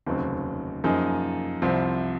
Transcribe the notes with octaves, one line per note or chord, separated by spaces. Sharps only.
F1 D#2 C#3 F#3 C4
F#2 F3 A#3 D#4 G#4
C2 C3 F3 C4